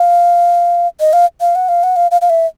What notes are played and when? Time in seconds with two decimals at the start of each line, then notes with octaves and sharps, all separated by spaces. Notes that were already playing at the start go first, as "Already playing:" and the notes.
Already playing: F5
1.00 D#5
1.13 F5
1.41 F5
1.55 F#5
1.68 F5
1.83 F#5
1.96 F5
2.11 F5
2.21 F5
2.29 E5